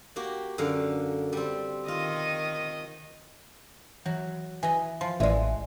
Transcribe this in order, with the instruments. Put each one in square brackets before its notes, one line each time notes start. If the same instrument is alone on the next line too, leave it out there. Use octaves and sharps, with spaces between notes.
[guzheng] A#3 F#4 G4
F#2 D3 F5
G3 C4
[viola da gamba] D#3 D#5 [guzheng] F4
[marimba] E3 [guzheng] F#3
[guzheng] E3 D#5 [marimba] G#5
[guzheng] F3 [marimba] C6
[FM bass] A1 [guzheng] E3 G#3 [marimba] D5 E5